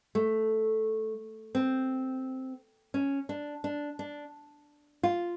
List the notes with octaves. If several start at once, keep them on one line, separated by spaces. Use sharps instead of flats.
A3
C4
C#4
D4
D4
D4
F4